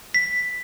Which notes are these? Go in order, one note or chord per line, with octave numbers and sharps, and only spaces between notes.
B6